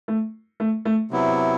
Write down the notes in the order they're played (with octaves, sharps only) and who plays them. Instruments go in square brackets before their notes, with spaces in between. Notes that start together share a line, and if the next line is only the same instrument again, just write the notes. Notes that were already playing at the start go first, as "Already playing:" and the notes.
[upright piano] A3
A3
A3
[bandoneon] C3 F#3 B3 E4